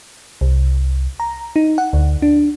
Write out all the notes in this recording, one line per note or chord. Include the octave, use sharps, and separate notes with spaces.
C2
A#5
D#4
F#5
D2
D4